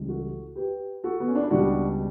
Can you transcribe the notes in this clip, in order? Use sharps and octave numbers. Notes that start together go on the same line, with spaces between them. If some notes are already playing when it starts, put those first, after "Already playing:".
Already playing: C#2 C#3 E3 G3
F#4 A4
G4 B4
F#4 A4
B3
C#4
D4
E4
C#2 B2 G3 D4 F#4